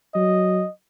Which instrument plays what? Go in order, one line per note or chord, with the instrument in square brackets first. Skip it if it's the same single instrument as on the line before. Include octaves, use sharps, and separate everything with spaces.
[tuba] F#3 [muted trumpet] D#5